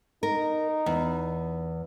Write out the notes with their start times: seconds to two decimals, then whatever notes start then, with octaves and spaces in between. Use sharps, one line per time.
0.23 D#4 A#4
0.86 E2